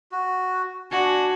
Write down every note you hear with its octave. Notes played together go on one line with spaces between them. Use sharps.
F#4
D4 F#4 G#5